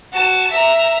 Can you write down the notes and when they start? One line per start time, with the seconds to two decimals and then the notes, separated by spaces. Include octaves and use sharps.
0.12 F#4 A5
0.51 E5 A#5